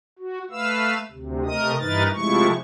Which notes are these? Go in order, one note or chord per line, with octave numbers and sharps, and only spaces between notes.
F#4
A3 B4 F5 E6
D2 C3
C3 A3 A#4 D#5 D#6
G2 E3 D#4 A#4 B4 A6
C3 F3 G#3 A3 E4 C#6